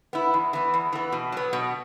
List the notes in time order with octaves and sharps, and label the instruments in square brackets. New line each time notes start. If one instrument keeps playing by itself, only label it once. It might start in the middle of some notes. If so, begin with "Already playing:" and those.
[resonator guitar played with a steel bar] B3 E4
E2
E3 B3
E2
E3 B3
B2
F#3 B3
B2